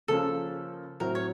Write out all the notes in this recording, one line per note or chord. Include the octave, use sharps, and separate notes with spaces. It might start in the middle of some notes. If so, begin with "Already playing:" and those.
C#3 F3 A#3 C#4 F4 A4
A2 F#3 C4 A#4
C#5